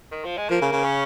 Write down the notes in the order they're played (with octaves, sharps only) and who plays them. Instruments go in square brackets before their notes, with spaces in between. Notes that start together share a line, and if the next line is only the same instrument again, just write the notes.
[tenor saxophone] D#3
F3
G#3
[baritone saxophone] F3 [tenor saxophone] A#3
[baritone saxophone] C#3
C#3
[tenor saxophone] C#4